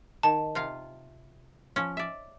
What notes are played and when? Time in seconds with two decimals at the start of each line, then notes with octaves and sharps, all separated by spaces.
0.23 D#3 A5
0.55 C3 F4 F5
1.76 F3 C#4
1.97 D5 E5